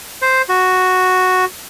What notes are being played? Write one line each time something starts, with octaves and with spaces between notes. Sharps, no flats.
C5
F#4